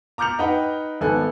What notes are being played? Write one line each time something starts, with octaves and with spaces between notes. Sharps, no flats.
A#5 D6 F6 G6 C#7 F7
D#4 B4 F#5 G5
G#1 B3 A4 G#5 F#6